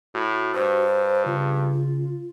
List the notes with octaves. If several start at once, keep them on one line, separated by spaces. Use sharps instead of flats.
A2 F#4
G2 C5
C#3 F4